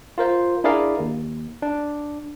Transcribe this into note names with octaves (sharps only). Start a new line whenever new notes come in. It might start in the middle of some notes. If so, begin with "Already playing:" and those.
F4 A#4 C5 F5
D4 E4 G#4 A#4 D5 F5
D#2
D4